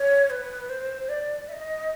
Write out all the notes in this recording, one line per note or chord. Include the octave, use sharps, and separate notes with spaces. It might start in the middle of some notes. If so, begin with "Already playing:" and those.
Already playing: C#5
B4
C5
D5
E5
D#5